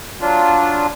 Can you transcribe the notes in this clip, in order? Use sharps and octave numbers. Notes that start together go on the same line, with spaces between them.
F#3 D4 F4